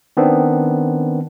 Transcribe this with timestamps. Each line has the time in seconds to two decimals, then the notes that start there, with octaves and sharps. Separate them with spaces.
0.17 D#3 B3 C4 D4